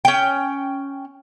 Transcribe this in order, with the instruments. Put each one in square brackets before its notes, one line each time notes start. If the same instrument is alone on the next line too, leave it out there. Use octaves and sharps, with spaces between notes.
[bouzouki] C#4 G5